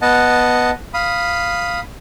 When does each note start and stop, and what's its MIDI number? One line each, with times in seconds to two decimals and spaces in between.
0.02 0.71 59
0.02 0.71 75
0.02 0.71 78
0.02 0.71 81
0.94 1.80 77
0.94 1.80 83
0.94 1.80 87